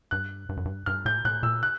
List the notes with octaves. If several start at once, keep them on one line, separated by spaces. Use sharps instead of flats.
G2 F#6
G2
F#2
G2
G2 F6
A2 G6
A2 F#6
A#2 E6
F#6